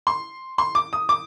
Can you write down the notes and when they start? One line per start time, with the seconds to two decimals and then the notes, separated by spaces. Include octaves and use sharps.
0.07 C6
0.58 C6
0.75 D6
0.93 D#6
1.09 D6